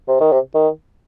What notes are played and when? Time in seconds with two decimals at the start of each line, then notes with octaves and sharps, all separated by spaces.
0.08 C3
0.21 D#3
0.32 C3
0.54 D#3